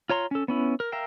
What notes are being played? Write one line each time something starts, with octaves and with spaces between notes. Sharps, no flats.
F4 C#5 A#5 C6
C#4 A4
B3 C#4 E4
A#4
A#4 E5 F5 G5